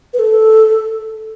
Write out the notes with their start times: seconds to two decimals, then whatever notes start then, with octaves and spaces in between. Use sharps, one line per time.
0.13 B4
0.19 A4